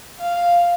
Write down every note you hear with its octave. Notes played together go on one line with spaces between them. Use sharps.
F5